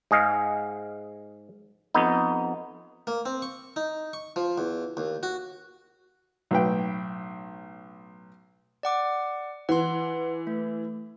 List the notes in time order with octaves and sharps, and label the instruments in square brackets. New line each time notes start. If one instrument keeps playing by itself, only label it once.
[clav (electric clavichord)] G#2 G#4 D#5 F5
F2 B3 D#4
[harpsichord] A#3
C4
C#6
D#4
C#6
F3
E2
D#2
F#4
[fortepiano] B1 A2 B4 G5
[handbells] D5 F#5 D6
[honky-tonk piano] E3 [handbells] F#5 C6
[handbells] A3